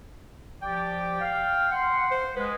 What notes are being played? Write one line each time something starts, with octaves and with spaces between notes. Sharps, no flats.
F3 G4 D5 G5
F5
F#5 C6
C5
G#3 B4